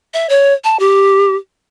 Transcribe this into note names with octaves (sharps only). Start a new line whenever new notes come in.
E5
C#5
A5
G4